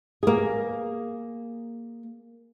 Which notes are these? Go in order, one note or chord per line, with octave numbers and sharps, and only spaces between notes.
A#3 G#4